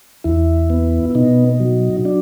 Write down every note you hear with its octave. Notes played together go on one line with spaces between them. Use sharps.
E2 E4
B3
B2 D#4
F#3
D4